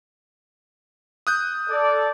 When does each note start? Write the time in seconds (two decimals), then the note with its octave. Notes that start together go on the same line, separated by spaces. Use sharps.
1.27 D#6 F#6 G6
1.70 A4 D5